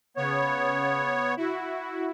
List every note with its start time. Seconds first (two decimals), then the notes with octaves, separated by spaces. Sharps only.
0.17 C#3 B3 C#5
1.37 E4 F#4